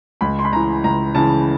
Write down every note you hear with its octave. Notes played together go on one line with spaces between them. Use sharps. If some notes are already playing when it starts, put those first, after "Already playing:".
C#2 B5
C6
B5
C#3 E3 A#5
C#2 A#5
C#3 E3 A5